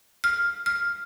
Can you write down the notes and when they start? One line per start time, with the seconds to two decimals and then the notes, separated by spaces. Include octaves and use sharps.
0.24 F6
0.66 F6